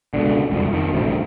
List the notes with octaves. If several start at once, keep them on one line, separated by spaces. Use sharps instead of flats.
C#2 B2 D3
E1 C2 F2
F2 D#3
D#1 A1 D2 C3